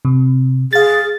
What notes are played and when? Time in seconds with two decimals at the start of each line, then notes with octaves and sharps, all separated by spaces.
0.05 C3
0.73 G#4 F5 A6